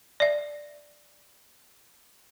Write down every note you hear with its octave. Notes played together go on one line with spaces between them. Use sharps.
D5 E5